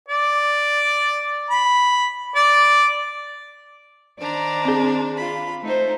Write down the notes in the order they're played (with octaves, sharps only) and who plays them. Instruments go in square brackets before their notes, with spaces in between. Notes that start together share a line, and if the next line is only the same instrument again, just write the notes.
[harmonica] D5
B5
D5
[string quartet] D#3 D4 C5 [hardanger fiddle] D5 A#5
[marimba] C4 G#4
[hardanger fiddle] F4 B5
[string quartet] A3 [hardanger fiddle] D#4 C5